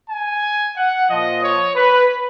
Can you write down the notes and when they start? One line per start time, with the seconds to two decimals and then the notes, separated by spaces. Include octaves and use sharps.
0.11 G#5
0.77 F#5
1.10 A#2 F3 D#5
1.44 C#5
1.76 B4